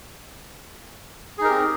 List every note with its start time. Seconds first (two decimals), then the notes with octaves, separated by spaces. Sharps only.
1.38 G#4
1.41 D#4
1.44 A#4
1.48 G4
1.51 C4